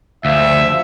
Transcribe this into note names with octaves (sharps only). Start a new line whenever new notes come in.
F#1 D2 F3 E5 F5